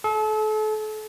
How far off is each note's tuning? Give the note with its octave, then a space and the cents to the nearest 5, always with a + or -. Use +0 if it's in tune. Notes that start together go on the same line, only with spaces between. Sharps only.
A4 -35